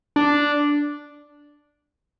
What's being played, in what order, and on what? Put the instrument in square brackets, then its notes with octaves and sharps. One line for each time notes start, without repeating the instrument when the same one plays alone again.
[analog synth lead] D4